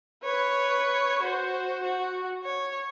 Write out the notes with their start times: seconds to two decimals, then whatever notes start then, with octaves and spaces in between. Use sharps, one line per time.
0.24 B4 C#5
1.22 F#4 C5
1.83 F#4
2.44 C#5